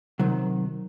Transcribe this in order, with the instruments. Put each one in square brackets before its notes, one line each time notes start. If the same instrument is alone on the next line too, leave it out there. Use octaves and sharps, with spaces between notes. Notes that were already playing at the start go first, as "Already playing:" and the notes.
[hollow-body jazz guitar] C3 D#3 F#3